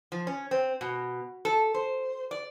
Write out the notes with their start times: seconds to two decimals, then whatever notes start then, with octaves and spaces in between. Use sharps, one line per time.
0.12 F3
0.27 C#4
0.51 C4
0.81 B2
1.45 A4
1.74 C5
2.31 D5